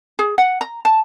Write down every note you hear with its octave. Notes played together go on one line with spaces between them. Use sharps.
G#4
F#5
A#5
A5